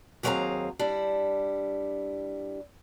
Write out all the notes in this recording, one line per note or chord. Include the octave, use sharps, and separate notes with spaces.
D#2 F#3 C4 G#4 F5 A#5
G3 D4 E4